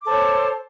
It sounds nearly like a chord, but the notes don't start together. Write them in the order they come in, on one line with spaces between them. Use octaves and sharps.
D6 A4 C5 C#5